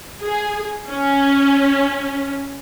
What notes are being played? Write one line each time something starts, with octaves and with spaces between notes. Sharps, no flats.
G#4
C#4